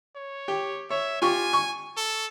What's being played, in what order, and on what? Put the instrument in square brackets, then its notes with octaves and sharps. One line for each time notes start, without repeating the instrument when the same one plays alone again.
[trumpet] C#5
[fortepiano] G4
[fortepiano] C#5 [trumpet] E5
[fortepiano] F4 G4 C#6 [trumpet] G#5
[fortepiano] C#6
[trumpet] A4